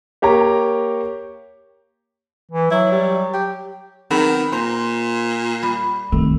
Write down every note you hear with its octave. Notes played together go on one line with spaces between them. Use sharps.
A#3 G4 C#5 A#5
E3
F#3 E4
G3
G4
D#3 F#3 B3 C4 G#4
A#2 C5 A#5 C6
G3
C2 D#3 A3